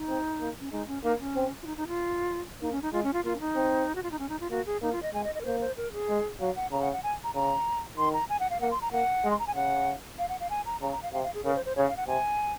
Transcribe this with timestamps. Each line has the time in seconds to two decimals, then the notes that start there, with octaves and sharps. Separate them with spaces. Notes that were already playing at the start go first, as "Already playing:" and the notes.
Already playing: D#4
0.08 C4
0.40 A#3
0.60 C#4
0.72 G#3 D#4
0.88 C#4
1.03 A#3 D#4
1.19 C#4
1.36 C4
1.62 F4
1.67 D#4
1.77 D#4
1.88 F4
2.62 A#3 D#4
2.72 C#4
2.82 D#4
2.93 G#3 F4
3.04 C#4
3.14 F4
3.25 A#3 F4
3.36 C#4
3.40 D#4
3.55 C4
3.95 F#4
4.03 F4
4.11 D#4
4.19 C#4
4.29 D#4
4.40 F4
4.50 A#3 F#4
4.66 G#4
4.82 A#3 D#4
4.92 F4
5.03 D#5
5.13 G#3 G#5
5.24 D#5
5.35 D#5
5.41 A#4
5.45 A#3 C5
5.61 C5
5.77 A#4
5.93 G#4
6.09 G#3
6.40 F#3 F5
6.56 F#5
6.71 C#3 A#5
6.82 F#5
6.93 F#5
7.03 G#5
7.24 A#5
7.35 C#3 A#5
7.97 D#3 C6
8.13 A#5
8.30 G#5
8.40 F#5
8.51 F5
8.61 A#3 F#5
8.71 C6
8.82 A#5
8.92 A#3 F#5
9.24 G#3
9.31 C6
9.39 A#5
9.47 G#5
9.55 C#3 F#5
10.19 F5
10.29 F#5
10.40 F5
10.50 G#5
10.66 A#5
10.81 C#3 A#5
10.92 A#5
11.03 F5
11.13 C3 F5
11.24 F5
11.34 G#4
11.44 C#3 A#4
11.55 C5
11.66 C5
11.76 C#3 C#5
11.87 F5
11.97 F#5
12.08 C3 G#5